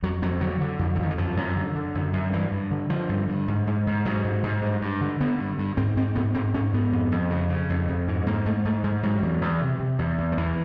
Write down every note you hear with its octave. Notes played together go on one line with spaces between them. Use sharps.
F2 F#3
F2 F#3
D3 F#3
D3
F2
D3
F2 D#3
E3
F#2 F3
F#2
D3
D3
F#2
F#2
G2 E3
G2
D3
D3 F3
G2
G2
G#2
G#2
G#2
G#2 F#3
G#2
G#2
G2
G2
D3
D3 B3
G2
G2
G#2 C4
G#2 C4
G#2 B3
G#2 C4
G#2 C#4
G#2 B3
F2
F2
C#3
C#3
F2
F2
G#2
G#2 A#3
G#2 A3
G#2 A3
G#2 G#3
G#2 F#3
E2
E2
C3
C3
E2
E2
F3
E2 E3